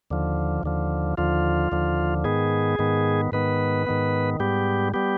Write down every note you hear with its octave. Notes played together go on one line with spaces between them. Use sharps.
D#2 D3 F3
D#2 D3 F3
D#2 D3 F3 F4
D#2 D3 F3
G#2 D#3 B3 G#4
G#2 D#3 B3
G#2 D#3 B3 B4
G#2 D#3 B3
G#2 G3 B3 G4
G3 B3 G4